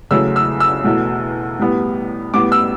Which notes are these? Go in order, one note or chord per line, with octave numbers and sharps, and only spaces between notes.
E2 C#3 F#3 A3 E6
E6
E6
E2 B2 A3
A2 G3 B3
A2 G3 B3 D6
E6